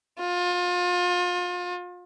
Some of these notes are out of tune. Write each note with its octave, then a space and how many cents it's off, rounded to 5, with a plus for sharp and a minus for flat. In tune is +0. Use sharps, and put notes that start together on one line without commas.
F4 +30